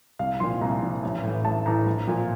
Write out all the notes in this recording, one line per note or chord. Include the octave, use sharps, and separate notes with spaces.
C2 F5
A#2 F3 C6
C2 A#5
A#2 F3
A1
A2 E3
A1 A5
A2 E3 A#5
A#1
A#2 F3